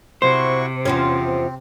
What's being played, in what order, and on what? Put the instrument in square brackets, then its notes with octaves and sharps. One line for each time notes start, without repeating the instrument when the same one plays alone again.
[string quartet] C3 [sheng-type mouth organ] E4 F#4 C#6 [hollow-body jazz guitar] C5
[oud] E2 F3 C#4 [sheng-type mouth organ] C4